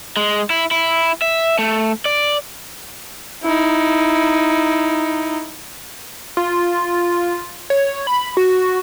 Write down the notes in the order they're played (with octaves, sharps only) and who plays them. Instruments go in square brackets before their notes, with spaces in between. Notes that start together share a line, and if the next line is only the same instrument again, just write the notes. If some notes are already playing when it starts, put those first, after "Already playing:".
[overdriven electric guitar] G#3
E4
E4
E5
A3
D5
[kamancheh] D#4 E4
[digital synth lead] F4
C#5
B5
F#4